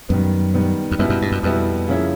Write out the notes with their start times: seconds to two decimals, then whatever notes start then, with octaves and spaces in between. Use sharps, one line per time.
0.09 F#2 D#3 G3 B3
0.54 D#3 G3 B3
0.91 F2
0.99 F#2 B2 G3 B3 E4
1.10 F#2
1.22 G2
1.32 F#2
1.43 F2 B2 G3 B3 E4
1.88 C#3 F3 A#3 C#4 E4